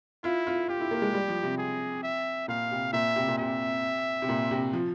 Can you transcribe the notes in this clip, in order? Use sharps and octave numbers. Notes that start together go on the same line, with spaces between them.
E4 F4
F4
F4 G4
E4
A#3
G#3
G3
F3
C3
G#4
E5
A#2 F5
C3
A#2 E5
C3
A#2
C3 E5
C3
A#2
C3
F3